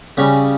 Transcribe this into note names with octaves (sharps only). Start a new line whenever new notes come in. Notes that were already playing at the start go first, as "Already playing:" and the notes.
C#3 G3 C#4